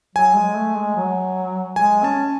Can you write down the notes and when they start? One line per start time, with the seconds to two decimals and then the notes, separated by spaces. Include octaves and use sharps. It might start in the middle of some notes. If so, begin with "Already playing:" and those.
0.15 F#3 G#5
0.35 G#3
0.56 A3
0.76 G#3
0.96 F#3
1.76 G#3 G#5
2.04 C#4 A5